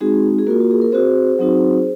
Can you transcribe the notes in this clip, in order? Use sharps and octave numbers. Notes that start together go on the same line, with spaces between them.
G#3 C4 D#4 F#4 G#4
G#4
A#3 F4 F#4 A#4
F#4
G#4
A#4
C4 F#4 G#4 C5
F#3 C4 D#4 F#4